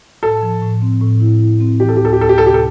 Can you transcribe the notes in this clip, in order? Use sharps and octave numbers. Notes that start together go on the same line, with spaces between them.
A2 A4
F3
A2
C4
A2
E4
E4
C4
E3 G4
A4
G4
D2 A4
G4
D2 A4
G4
C3 A4
G4
A4